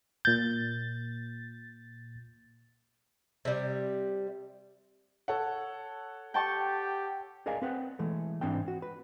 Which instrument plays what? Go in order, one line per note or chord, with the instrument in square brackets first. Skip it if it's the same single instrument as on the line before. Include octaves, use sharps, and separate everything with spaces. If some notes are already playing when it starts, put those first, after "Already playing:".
[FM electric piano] A#2 A6 [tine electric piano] G6
[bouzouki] C3 G3
[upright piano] A4 C#5 F#5
[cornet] G4 [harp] G5 A5 C#6
[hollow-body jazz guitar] G#4 A#4 D5 D#5 F5 G#5
C4 B4 F#5 G5
E3 G#3 A3
G#2 E3 C4 D4 G5
F#4
B4